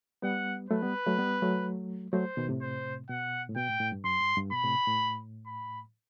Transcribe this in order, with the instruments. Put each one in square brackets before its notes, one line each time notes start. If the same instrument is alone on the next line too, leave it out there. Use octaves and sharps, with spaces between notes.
[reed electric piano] G3 B3 [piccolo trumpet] F#5
[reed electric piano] F#3 A3 [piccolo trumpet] B4
[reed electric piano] G3 B3
F#3 A3
G3 B3
F#3 A3
[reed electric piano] F#3 A3 [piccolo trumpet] C5
[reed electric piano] B2 D#3
A2 C3
[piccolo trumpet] C5
[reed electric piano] B2 [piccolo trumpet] F#5
[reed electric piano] A2
[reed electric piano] B2 [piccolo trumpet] G5
[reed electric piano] A2
A2
G2
[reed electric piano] F#2 [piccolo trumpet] C6
[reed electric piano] G2
G2
[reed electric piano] B2 [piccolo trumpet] B5
[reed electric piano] A2 C3
A2
[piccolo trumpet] B5